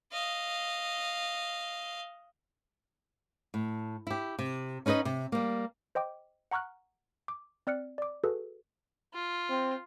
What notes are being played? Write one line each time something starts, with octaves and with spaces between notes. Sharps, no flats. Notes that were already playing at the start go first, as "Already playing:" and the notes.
D#5 F5
A2
E4 G4
C3
C#4 D#4 B4 C5 D#5
C3
G3 A#3
C5 D#5 G5 D6
F#5 A#5 C#6 F6 F#6
D6
C4 D5 F6 F#6 C#7
D5 D6
F#4 G#4 A4 B4
F4
C4